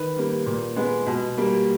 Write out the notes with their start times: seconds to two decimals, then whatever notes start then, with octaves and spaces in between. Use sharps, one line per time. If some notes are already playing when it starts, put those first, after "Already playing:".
Already playing: D#3 B4
0.16 G3 A#3
0.46 A#2
0.76 G#3 B3
1.07 B2
1.37 G3 A#3